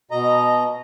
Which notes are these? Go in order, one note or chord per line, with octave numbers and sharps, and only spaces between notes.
B2 D#5 A#5